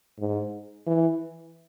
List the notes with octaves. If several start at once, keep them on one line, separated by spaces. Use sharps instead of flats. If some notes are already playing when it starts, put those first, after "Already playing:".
G#2
E3